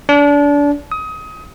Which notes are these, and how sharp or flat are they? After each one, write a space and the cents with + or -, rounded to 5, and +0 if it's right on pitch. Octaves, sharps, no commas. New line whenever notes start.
D4 -30
D#6 +25